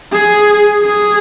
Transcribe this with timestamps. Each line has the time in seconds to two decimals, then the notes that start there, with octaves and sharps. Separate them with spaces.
0.12 G#4
0.82 G#4